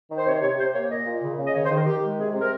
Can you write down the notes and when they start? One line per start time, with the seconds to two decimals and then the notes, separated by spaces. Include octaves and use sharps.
0.10 D#3
0.17 C5
0.26 C3 C#5
0.42 C3 C#5
0.58 C3 C5
0.74 A#3 C#5
0.90 A#2 D#5
1.06 A#2
1.22 C#3
1.38 C#3
1.45 D#5
1.54 D#3 C#5
1.65 C5
1.70 D#3 A#4
1.86 D#3 G4
2.02 G#3
2.18 C3 G#4
2.34 C3
2.40 A#4